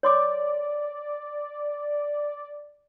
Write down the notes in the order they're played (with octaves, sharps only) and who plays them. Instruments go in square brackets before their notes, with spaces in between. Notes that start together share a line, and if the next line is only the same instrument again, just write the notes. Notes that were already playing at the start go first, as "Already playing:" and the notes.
[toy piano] C#5 C6 D6 [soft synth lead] D5